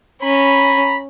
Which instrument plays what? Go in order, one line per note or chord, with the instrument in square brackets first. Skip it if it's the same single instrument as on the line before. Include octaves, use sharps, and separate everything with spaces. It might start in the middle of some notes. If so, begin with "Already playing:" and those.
[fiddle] C#4 [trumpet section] A#5 B5